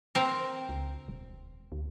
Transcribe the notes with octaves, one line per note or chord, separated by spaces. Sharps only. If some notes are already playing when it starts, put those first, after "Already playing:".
C4 A#4
C#2
D#1
D2